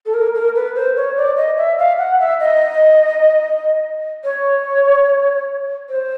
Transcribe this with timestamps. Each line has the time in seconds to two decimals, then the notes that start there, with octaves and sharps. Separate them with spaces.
0.06 A4
0.14 A#4
0.34 A#4
0.55 B4
0.75 C5
0.97 C#5
1.16 D5
1.37 D#5
1.57 E5
1.79 F5
1.98 F#5
2.20 E5
2.40 D#5
4.24 C#5
5.89 C5